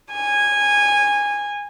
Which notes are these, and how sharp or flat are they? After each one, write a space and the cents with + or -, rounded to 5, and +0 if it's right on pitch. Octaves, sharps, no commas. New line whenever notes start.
G#5 -15